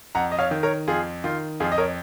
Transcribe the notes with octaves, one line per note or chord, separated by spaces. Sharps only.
F2 F#5 A#5
D#5
C#5 F5
D#3
A#4 C#5
F2 F4 G#4
D#3 F4
F2 F4 G#4
D#5
A#4 C#5